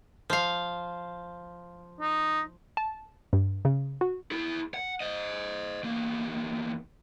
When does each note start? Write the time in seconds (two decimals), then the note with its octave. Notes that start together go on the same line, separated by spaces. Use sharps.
0.30 F3 F5
2.01 D#4
2.77 A5
3.33 G2
3.65 C#3
4.01 F#4
4.31 E4 G#4
4.74 F#5
5.01 C5 D#5
5.83 E2 A#3